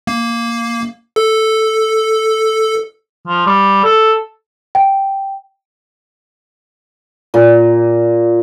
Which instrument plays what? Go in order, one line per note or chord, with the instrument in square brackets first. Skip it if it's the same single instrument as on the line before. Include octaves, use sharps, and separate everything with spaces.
[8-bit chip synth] A#3
A4
[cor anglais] F3
G3
A4
[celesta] G5
[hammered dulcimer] A#2